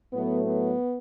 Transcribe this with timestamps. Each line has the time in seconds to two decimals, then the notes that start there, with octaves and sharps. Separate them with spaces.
0.12 A2 F#3 A3 B3
0.45 B3